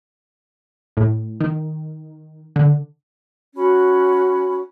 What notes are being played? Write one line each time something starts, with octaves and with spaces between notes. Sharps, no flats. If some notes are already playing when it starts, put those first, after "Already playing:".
A2
D#3
D3
C#4 F#4 B5